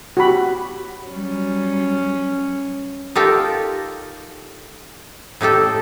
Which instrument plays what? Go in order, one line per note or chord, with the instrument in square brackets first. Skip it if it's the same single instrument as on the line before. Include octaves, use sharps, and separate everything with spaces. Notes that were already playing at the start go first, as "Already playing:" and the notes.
[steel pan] F#4 G4 B5
[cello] F#3 G3 [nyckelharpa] C#4
[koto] D#4 F4 G4 A4 A#4
A2 D#4 G4 A4